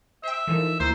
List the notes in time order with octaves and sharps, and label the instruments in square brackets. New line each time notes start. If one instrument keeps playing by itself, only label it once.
[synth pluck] C5 G5 [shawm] E5
[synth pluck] E3 F3 D#4 [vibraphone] A4 A#4
[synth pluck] D2 C6 [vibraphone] A#3 E4 A#5 [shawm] C5